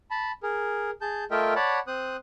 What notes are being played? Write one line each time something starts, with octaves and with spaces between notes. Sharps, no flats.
A5 B5
G#4 A#4
G#4 A5 G6
A3 F4 A#4 D#5 E5 G5
C#5 D5 F#5 A5 B5
C4 C5 D#6 F#6